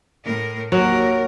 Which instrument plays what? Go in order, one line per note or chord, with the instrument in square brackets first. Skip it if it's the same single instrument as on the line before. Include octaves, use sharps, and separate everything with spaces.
[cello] A2 A#4
[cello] D#2 A#4 [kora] F#3